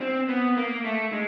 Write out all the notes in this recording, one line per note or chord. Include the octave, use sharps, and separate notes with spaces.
C4
B3
A#3
A3
G#3